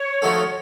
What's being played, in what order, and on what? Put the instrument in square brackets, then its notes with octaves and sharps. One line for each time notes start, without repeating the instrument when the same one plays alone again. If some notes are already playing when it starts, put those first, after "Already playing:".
Already playing: [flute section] C#5
[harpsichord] F3 A3 D#4 F#4 A4